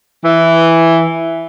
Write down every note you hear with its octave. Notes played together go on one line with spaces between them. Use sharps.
E3